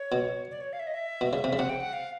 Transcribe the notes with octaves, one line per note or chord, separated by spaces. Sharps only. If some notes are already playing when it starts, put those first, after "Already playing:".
Already playing: C#5
B2
D5
C#5
F5
E5
D#5
E5
B2
C#3
C3
C#3
C3 F#5
G5
F#5
F5